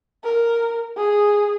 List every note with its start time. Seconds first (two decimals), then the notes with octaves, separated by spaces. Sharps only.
0.23 A#4
0.96 G#4